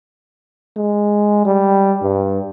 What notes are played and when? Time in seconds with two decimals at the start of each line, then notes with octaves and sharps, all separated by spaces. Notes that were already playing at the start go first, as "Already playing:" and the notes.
0.77 G#3
1.45 G3
2.02 G2